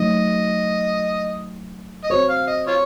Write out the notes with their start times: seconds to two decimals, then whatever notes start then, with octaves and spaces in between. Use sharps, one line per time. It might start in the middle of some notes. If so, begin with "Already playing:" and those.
Already playing: F#3 A3 D#4 D#5
2.04 D#5
2.10 C4 F#4 C5 C#5
2.29 F5
2.48 D#5
2.67 F4 C#5